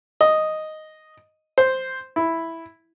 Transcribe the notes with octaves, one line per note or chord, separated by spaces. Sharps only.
D#5
C5
E4